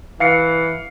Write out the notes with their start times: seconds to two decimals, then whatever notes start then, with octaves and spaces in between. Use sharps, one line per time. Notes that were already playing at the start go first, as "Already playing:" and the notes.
0.20 E3 F5 C7 C#7